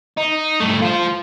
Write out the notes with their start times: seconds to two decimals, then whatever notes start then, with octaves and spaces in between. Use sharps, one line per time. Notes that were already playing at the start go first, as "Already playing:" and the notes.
0.17 D#4
0.60 G2 A3
0.82 F4 C5